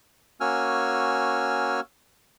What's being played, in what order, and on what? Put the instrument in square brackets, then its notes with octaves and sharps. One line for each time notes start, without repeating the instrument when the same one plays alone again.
[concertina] A#3 C#4 F#4 G#5 E6 F6